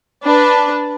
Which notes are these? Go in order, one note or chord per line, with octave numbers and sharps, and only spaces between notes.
D4 B4